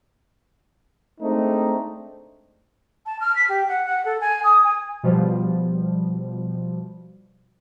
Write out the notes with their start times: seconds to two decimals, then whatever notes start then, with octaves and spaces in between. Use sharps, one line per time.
1.20 G#3 A3 C4 D4 D#4
3.06 A5
3.20 F6
3.35 B6
3.49 G4
3.68 F#5
3.85 F#5
4.05 A4
4.20 G#5
4.43 D#6
4.63 G#5
5.03 B2 F3 G3